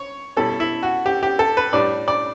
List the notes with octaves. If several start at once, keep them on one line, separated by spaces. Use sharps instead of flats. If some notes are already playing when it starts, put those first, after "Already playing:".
Already playing: C#5
B2 G3 C#4 E4 A4
E4
F#4
G4
G4
A4
B4
A2 G3 D4 D5
D5